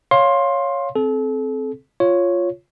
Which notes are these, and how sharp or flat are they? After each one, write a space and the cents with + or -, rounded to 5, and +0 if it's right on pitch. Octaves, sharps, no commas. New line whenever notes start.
C#5 +0 F5 +5 C6 +15
C4 +0 A4 -35
F4 +0 C#5 +0